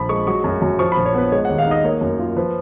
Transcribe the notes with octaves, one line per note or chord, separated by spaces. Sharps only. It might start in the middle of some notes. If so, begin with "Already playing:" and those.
Already playing: A#1 F3 B5
G#3 C#6
F#3 C#6
F#2
F#2
F3 C#6
B5
A#1
C#5
B3 B4
G#3 C#5
F#5
D#2
F5
D#4 D#5
A#3 C#5
F#2
F4
F3 B4